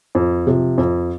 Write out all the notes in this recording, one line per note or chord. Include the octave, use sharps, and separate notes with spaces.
F2
C3 F3
F2